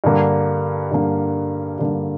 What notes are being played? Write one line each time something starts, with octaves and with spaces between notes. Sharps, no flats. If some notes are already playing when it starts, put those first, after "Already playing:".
G2 D3 A#3
G2 D3 A#3
G2 D3 A#3